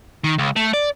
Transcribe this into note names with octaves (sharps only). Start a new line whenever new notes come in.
D#3
C#2
A3
D5